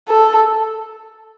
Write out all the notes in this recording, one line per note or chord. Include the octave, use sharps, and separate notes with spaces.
A4